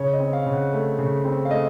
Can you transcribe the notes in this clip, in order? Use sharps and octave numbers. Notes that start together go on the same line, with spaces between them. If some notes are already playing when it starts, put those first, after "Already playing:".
Already playing: C#3 C#5
D#5
C4
F5
C#3
F#5
A3
C#3
C4
F5
A3 D#5